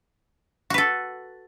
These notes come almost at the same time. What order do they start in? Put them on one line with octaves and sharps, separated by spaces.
F#4 B4 A4